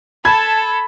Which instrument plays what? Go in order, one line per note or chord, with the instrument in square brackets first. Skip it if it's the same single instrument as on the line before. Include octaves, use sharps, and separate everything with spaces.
[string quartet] A4 [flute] A5 [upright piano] B5 G#6